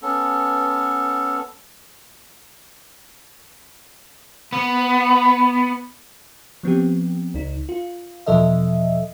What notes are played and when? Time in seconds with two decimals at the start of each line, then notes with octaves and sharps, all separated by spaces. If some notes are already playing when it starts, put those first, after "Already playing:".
0.02 B3 C#4 A4
4.53 B3
6.63 F3 B3 C4 G4
7.34 C#2 D#4
7.69 F4
8.26 E2 B2 F3 A4 D#5 E5